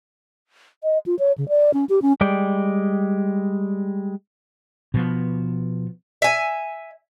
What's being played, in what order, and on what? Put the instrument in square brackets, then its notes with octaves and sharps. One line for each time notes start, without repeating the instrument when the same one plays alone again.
[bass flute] D#5
F4
C#5
C#3
D5
C#4
G4
C#4
[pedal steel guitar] G3 G#3 D5 G5
[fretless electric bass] B2 F3 B3
[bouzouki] E5 G#5